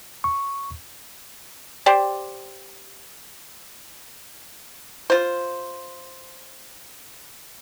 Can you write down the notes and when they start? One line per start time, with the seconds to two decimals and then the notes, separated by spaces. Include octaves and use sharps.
0.24 C#6
1.86 G4 C5 D5
5.10 F4 C5